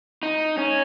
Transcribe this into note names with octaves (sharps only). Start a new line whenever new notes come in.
D#4
C#4